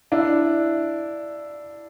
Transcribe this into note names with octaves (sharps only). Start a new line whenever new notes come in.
D4 E4